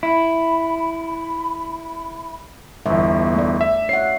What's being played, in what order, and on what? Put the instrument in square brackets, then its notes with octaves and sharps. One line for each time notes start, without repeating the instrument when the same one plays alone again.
[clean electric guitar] E4 [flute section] B5
[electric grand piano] G1 E2 [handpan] E5
[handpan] A3 D5
[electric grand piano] E5
[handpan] C#5 E5 F#5 [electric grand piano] C7